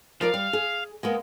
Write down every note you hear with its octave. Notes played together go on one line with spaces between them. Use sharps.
F3 A#4 D5 F5
G3
G#4
G#3 A#3 B3